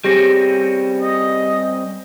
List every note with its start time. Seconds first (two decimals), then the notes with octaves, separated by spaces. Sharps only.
0.04 G3 C4 C#4 G4 G#4 A#6
1.00 D#5